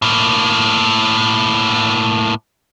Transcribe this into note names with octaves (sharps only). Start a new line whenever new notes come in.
A2 A#3